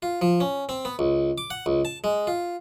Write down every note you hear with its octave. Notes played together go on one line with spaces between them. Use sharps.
F4
F3
C#4
C4
B3
C#2
D6
F#5
C#2
A5
G#3
F4